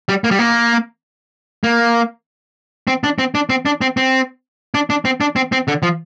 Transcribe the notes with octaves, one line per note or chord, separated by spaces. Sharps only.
G3
A#3
G3
A#3
A#3
C4
D4
C4
D4
C4
D4
C4
C4
D4
D4
C4
D4
C4
C4
D3
F3